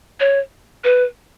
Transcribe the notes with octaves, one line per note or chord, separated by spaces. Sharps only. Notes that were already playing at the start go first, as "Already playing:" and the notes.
C#5
B4